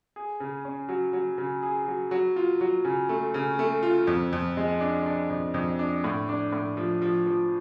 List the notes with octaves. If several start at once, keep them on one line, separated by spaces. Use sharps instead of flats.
G#4
C#3
C#4
F#3
F#3
C#3
G#4
F#3
F#3
F4
F#3
C#3
A3
C#3
A3
F4
F2
F2
G#3
D4
D4
F2
F2
D4
A2
D4
A2
F3
F3
F3